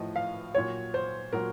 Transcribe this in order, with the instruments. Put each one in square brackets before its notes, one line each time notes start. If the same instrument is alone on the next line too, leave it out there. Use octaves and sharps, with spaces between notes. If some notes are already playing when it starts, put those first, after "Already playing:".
Already playing: [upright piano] A2 F3 D#5
F5
A#2 F#3 C#5
C5
A#2 F#3 A#4